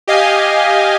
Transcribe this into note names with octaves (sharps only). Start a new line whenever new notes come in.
G4 D#5 F5 G#5